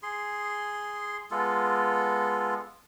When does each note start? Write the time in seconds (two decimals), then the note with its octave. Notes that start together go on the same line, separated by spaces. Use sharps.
0.03 G#4 C6
1.31 G#3 B3 F4 A4